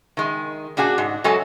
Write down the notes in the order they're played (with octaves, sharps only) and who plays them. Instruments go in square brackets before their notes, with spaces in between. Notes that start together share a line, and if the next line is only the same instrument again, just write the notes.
[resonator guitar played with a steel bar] D#3 G#3
A#2 D4 F#4 G#4
G#2
F#3 G#3 F#4 A4 G#5